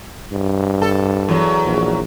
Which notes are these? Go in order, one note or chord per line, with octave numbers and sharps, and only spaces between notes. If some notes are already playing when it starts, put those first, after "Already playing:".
G2
A4
E2 F#3
A#1